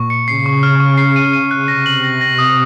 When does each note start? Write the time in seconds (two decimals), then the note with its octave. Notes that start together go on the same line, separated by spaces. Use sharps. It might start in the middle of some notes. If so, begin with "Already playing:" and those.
Already playing: A#2 C#6
0.10 C#7
0.28 C#3 C7
0.46 C#6
0.63 F6
0.80 C#6
0.98 C7
1.16 D#7
1.33 D#7
1.51 F#6
1.68 C3 A#6
1.86 F#7
2.04 A#6
2.21 A#6
2.39 D#6